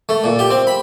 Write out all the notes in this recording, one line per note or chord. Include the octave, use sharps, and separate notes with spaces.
A3
A#2
G4
C4
B5